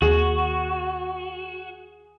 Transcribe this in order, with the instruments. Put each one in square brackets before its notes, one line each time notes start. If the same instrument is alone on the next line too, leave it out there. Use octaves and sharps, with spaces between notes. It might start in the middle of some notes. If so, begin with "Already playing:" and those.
[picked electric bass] D#2 [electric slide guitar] F#4 [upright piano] G#4